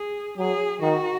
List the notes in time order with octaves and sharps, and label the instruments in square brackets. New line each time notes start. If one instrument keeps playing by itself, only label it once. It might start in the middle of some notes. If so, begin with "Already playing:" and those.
Already playing: [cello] G#4
[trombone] F#3 [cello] G#4
[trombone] D#3 [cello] F#4